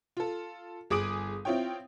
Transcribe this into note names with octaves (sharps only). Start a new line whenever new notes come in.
F4 A4
G1 G#4 D6 D#6 D7 F#7
C4 E4 F4 C#5 G5